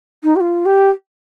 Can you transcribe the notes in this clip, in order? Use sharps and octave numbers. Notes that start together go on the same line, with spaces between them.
D#4
G4
F4
G4